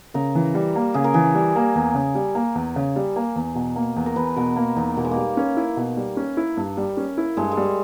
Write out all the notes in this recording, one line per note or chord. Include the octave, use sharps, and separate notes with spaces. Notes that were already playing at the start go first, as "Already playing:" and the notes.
C#3 A#4
E3
G3
A#3
C#3 G#4
A#4
E3 G#4
G3
A#3
E2
C#3
G3
A#3
E2
C#3
G3
A#3
E2
B2
A#3
E2
A#4
E2 B4
B2 A#4
A#3
E2 D#4
B2 A#3
G#3
G3 A#3
A#3 C#4
E4
B2
G3
C#4
E4
G2
G3
C#4
E4
G2 G#3
G#3
G3